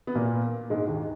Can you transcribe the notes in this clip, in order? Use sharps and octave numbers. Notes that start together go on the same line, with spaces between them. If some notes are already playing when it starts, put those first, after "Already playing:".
B3
A#2 A#3
G#2 G#3
D#2 D#3